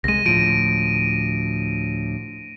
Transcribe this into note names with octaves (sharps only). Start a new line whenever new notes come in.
C2 G#3 A#6 D#7
D2 A2 F3 D7 D#7